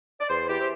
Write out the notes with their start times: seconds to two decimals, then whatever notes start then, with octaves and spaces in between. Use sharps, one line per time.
0.20 D5
0.29 E2 C5
0.49 E3 G4
0.60 C5